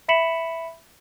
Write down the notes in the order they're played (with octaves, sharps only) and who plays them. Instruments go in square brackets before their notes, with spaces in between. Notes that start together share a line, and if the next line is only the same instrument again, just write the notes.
[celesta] E5 B5 B6 C#7 E7 F#7